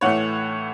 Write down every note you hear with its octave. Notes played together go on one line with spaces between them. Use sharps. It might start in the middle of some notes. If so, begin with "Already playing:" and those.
A2 E3 A3 C#5 F#5